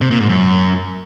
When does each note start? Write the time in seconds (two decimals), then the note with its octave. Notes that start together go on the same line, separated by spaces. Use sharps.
0.01 C3
0.11 A#2
0.20 G#2
0.29 F#2